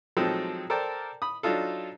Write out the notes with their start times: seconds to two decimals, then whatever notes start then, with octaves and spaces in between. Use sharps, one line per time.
0.17 F3 F#3 G#3 C4 D#4 A4
0.70 A4 A#4 C5 D5 G5 A5
1.22 B5 D#6
1.43 F#3 D4 D#4 F4 A4